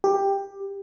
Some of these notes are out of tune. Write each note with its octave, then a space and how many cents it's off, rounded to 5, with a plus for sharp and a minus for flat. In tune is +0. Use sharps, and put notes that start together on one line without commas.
G4 +10